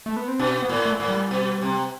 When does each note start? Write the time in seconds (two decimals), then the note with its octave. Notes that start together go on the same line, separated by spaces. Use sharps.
0.06 A3
0.17 B3
0.28 C4
0.39 B2 D4
0.62 B3
0.69 A2
0.86 A3
1.00 A2
1.08 G3
1.31 B2
1.62 C3